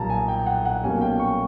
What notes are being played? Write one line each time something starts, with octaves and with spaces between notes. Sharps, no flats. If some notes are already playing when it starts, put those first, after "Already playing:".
Already playing: B1 A#2 G3 A5 A#5
G#5
G5
F#5
F#5
B1 B2 G3 A#3 C#4 G#5
G5
C#6